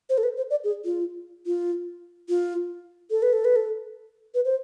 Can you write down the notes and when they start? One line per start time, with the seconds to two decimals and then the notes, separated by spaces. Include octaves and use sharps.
0.09 C5
0.18 A4
0.23 B4
0.37 C5
0.50 D5
0.64 G#4
0.85 F4
1.46 F4
2.29 F4
3.11 A4
3.22 B4
3.33 A4
3.45 B4
3.56 A4
4.34 B4
4.45 C5